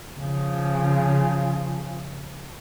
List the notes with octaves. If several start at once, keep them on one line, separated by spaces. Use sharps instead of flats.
C#3 F3